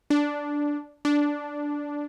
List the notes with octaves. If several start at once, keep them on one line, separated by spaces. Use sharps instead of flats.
D4
D4